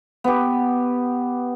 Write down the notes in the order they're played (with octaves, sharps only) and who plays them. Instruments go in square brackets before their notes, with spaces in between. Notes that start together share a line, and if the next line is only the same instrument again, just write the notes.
[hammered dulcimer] B3 G4